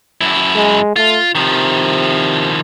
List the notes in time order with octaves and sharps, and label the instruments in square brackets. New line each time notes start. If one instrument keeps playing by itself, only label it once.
[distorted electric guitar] F#2 E4
[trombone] G#3
[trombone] A3 [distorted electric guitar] F4
[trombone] C3 [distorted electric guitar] D#3 F3